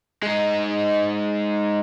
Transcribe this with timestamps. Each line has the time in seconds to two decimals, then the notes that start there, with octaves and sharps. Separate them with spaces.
0.23 G#3 D#4